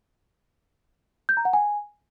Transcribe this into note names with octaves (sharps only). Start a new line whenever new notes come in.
G6
A#5
F#5
G#5